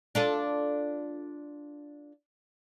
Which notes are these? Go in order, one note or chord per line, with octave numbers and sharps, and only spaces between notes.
D4 F4 A4